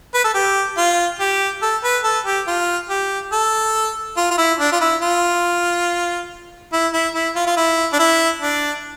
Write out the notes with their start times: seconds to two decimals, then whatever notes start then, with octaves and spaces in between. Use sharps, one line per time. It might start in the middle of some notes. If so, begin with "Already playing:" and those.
0.14 B4
0.24 A4
0.34 G4
0.77 F4
1.19 G4
1.62 A4
1.84 B4
2.04 A4
2.26 G4
2.47 F4
2.89 G4
3.32 A4
4.17 F4
4.31 F4
4.38 E4
4.59 D4
4.72 F4
4.81 E4
5.02 F4
6.73 E4
6.93 E4
7.14 E4
7.36 F4
7.47 F4
7.57 E4
7.93 D4
7.99 E4
8.42 D4